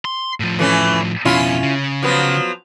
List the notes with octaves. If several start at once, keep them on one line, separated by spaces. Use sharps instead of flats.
C6
A2 F3
E3 A3 C#4
F2 B2 C#4 E4 F4
C#3
F3 F#3 B3